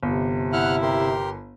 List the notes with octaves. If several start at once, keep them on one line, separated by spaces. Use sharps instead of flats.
G1 C3
E4 F#5 F6 F#6
G4 A#4 C6